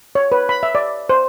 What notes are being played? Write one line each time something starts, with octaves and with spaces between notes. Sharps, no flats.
C#5
B4
B5
E5
D5
C5